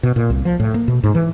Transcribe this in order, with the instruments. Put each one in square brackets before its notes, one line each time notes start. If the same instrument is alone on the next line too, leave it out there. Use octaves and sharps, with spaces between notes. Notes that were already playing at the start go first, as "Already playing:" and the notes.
[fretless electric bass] B2
A#2
C2
F3
A2
A#3
B2
G#2
E3